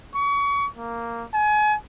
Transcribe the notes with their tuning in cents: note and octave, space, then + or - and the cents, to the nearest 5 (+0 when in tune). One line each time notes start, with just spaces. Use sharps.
C#6 +30
A#3 -5
G#5 +30